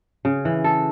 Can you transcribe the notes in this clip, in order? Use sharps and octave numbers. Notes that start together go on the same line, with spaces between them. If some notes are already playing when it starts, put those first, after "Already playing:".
C#3
E3
A4